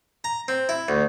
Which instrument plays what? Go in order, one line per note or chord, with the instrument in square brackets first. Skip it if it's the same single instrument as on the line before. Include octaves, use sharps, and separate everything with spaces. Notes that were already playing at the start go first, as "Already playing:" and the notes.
[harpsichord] A#5
C4
E4
D2